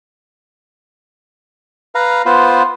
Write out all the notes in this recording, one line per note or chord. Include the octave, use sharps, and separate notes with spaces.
B4 F5 A#5
B3 F4 B4 C5